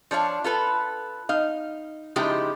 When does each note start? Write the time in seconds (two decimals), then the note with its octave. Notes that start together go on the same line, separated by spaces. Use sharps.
0.11 F3 D4 C#5 F5
0.44 F4 A4 B4
1.29 D#4 F5
2.16 C#3 F3 G#3 D#4 E4 G4